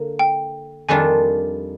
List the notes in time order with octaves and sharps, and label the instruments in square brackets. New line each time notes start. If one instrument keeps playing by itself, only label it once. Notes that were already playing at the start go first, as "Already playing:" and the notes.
Already playing: [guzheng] D3 A#3
[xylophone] G5
[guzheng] F2 D#3 G3 D4 F4 [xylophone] G#5